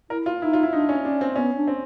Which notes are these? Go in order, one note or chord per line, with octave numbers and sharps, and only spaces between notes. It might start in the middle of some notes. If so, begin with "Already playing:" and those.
E4 A#4
F4
D#4 E4
F4
E4
D4 D#4
C#4
C#4 D4
C4
B3 C#4
D4
C4